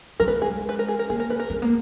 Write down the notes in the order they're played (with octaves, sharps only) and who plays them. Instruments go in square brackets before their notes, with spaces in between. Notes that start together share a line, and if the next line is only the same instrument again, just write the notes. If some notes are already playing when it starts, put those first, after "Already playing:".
[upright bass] F#3 [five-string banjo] A#4
[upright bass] G#3 [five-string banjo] B4
[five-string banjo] G#4
B4
A#4
G#4
A#4
[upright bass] A#3 [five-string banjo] G#4
[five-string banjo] A#4
B4
A#4
[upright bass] G#3
A#3